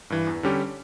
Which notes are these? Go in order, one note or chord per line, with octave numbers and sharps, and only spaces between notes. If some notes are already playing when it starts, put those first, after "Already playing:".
G2 E3
E2
D3 G3 C#4 G4